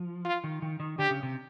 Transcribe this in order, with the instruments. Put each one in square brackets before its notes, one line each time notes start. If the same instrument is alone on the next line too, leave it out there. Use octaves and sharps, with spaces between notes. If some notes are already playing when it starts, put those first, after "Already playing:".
Already playing: [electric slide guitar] F3
[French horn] F4
[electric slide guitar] D#3
D#3
D#3
[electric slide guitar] D3 [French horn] G4
[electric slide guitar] C#3
C3